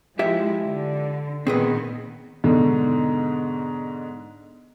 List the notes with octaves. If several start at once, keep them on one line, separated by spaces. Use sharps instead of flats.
F3 G#3 E4 G4 E5
D3
A#2 D#3 B3 C4 G#4 B4
G#2 B2 D3